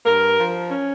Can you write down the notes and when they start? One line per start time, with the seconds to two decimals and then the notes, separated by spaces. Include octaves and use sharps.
0.06 G2 A#4
0.38 F3
0.71 C#4